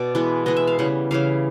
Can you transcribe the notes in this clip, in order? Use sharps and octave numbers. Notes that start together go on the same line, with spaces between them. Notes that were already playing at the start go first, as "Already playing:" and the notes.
Already playing: B2 D5
E3 G#3 B3
E3 G#3 B3 D#5
E5
F5
C#3 E3 G3 F#5
C#3 E3 G3 F5